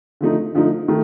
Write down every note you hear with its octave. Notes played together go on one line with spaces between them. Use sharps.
D3 F3 A3 D#4
D3 F3 A3 D#4
D#3 A3